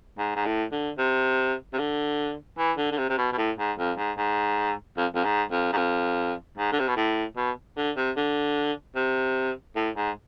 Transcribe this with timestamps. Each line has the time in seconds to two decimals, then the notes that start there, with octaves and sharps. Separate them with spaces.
0.18 G#2
0.36 G#2
0.46 A2
0.71 D3
0.98 C3
1.73 C3
1.78 D3
2.58 E3
2.77 D3
2.92 D3
2.98 C3
3.09 C3
3.18 B2
3.32 B2
3.37 A2
3.58 G#2
3.78 F2
3.98 G#2
4.17 G#2
4.97 F2
5.15 F2
5.24 G#2
5.51 F2
5.73 G#2
5.77 F2
6.57 G#2
6.72 D3
6.79 C3
6.88 B2
6.97 A2
7.36 B2
7.77 D3
7.96 C3
8.16 D3
8.96 C3
9.76 A2
9.96 G#2